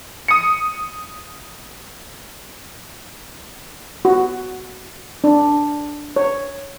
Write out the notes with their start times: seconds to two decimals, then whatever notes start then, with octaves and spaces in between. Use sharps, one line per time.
0.28 D#6 C#7
4.05 F#4
5.24 D4
6.16 C#5